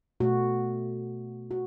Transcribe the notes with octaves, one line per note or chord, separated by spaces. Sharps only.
B2 A3 F#4
F#4